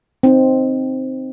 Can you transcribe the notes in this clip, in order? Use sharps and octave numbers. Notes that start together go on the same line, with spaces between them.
C4 D#4